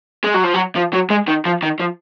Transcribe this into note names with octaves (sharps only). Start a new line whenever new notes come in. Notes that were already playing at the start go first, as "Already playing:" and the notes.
G#3
F#3
F3
F#3
F3
F#3
G#3
D#3
F3
D#3
F3